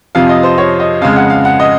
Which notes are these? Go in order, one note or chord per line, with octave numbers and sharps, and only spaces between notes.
F2 C3 F3 F5
D#5
C5
C#5
D#5
F2 C#3 G#3 F5
F#5
F5
F#5
D#5